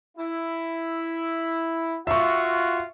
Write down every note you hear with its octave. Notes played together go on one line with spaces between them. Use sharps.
E4
F4 F#4 E5 C#6